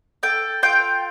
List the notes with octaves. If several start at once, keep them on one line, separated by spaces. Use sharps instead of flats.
A4 G5
F4 G5